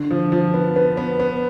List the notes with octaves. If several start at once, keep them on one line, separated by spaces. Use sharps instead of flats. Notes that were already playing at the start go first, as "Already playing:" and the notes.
Already playing: D3
F3
F3
B3
B3
B3
B3